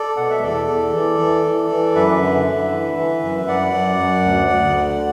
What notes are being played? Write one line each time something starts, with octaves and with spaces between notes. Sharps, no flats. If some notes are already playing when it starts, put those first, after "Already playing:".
Already playing: A4 D5
B2 F#5
E5
E2 A4 D5
E2
E3
E3
E3
E3
F#2 B4 E5
D3
D3
E3
E3
F#2
F#2 D5 F#5
F#2
F#2
D2
D2
D3